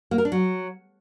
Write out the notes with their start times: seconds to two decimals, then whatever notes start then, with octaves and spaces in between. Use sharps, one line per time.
0.11 A#3
0.18 A#4
0.25 D4
0.32 F#3